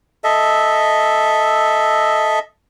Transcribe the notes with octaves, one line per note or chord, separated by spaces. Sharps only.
A4 D#5 E5